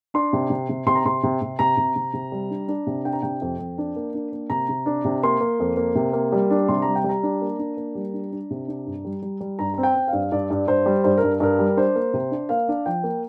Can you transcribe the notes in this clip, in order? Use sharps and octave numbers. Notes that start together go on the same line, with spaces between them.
D4 C6
C3
C3
C3
C3 C6
A#5
C3 C6
C3
C3
C3 A#5
C3
C3
C3
G3
D4
D4
C3
D4 G5
A#5
C3 G5
F2
F2
D4
A#3
D4
A#3
C3 A#5
C3
D4
C3
A#3 C6
A#3
F2
A#3
C3
A#3
G3
D4
C3 C6
G3 A#5
G5
G3
A#5
D4
A#3
D4
A#3
G3
D4
D4
C3
D4
G2
G3
G3
G3
G2 A#5
C4 A#5
G5
C4
F5
G2
G2 D5
G2
G2 C5
G3
G2 C5
A#4
G2
G2 A#4
G3
D4 C5
A#3
C3
D4
A#3 F5
D4
F3 G5
A#3